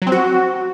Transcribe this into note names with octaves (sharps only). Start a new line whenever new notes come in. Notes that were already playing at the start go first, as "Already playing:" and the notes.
F#3
C4
F#4